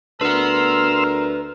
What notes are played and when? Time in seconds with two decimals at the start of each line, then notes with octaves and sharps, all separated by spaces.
0.21 D2 A#4 B4 F#5 C6 E6 F6